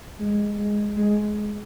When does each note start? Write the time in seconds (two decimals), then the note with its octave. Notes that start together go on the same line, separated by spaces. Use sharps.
0.19 G#3
0.58 G#3
0.97 G#3